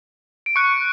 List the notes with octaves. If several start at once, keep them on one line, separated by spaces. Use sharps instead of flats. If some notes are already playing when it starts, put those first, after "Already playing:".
D7
C#6 F#6 C#7